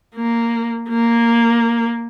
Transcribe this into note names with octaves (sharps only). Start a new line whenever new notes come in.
A#3
A#3